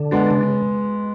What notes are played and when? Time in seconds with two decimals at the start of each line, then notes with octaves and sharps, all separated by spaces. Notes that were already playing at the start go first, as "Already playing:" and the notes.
Already playing: D3
0.11 G#3 B3 D4
0.31 C#3